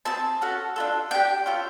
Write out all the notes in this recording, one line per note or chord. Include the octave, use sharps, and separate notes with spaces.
C4 E4 G#4 A5
C#4 F#4 A4
D4 F4 A4
D4 G4 G5
C#4 F4 A4